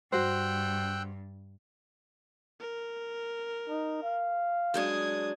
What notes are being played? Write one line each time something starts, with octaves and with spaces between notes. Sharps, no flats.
G2 F#4 C5 G5 E6 F#6
A#4
D#4
F5
F#3 G#3 D4 D#6 G#6